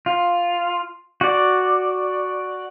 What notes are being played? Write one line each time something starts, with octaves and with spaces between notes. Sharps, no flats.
F4
F#4 D5